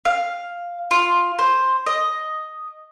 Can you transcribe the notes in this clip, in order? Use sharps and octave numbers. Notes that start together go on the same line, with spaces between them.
F5
F4
C5
D#5